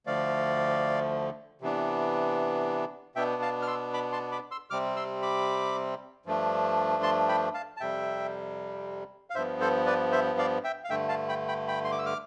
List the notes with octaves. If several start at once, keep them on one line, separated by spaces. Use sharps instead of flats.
D2 D3 F3 A3 D5 F5
C3 E3 B3 D4
B2 B3 D4 E5 G5
F5 A5
F6
C6 E6
B5 D6
A5 C6
B5 D6
C6 E6
C3 G3 C4 D6 F6
C6 E6
B5 D6
G2 F3 A3 D4
A5 C6
G5 B5
F5 A5
A5
F2 C3 G3 E5 G5
F5
G2 F3 B3 C5 E5
A4 C5
B4 D5
C5 E5
D5 F5
E5 G5
F5
G2 D3 A3 E5 G5
F5 A5
G5 B5
G5 B5
G5 B5
C6
D6
E6
D6 F6